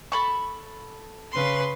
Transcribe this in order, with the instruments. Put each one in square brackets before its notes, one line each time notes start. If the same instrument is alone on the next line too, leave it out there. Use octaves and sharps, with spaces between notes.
[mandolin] A4 B5 C#6
[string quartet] C#3 B4 C6